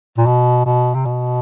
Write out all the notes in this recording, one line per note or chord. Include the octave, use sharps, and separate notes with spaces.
A#2
B2
B2
C3
B2